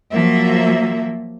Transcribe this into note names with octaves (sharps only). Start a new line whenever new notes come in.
F3 F#3 A#3 E5